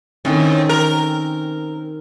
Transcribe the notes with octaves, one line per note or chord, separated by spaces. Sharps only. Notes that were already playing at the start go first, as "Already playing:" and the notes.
A2 D#3 C4 C#4
A#4